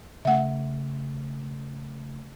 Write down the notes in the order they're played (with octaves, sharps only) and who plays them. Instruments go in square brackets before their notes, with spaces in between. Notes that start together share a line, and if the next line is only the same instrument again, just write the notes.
[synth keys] C#3 A3 [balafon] E5 F#5